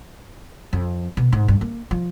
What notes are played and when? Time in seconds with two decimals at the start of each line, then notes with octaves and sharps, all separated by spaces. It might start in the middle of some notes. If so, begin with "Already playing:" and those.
0.73 F2
1.17 B2
1.32 G#2
1.48 G2
1.61 A#3
1.91 F3